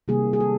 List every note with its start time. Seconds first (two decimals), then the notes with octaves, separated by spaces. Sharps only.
0.08 C3 D#3 G3 A#3 G#4
0.33 G#4
0.40 A4